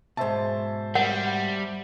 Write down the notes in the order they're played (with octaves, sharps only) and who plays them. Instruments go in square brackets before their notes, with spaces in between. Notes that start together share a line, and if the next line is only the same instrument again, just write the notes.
[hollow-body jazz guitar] G#2 B2 [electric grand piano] C5 E5 A5
[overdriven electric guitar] G3 [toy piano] F#5